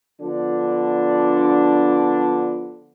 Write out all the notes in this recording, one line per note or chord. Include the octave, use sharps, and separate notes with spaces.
D3 F3 B3 D4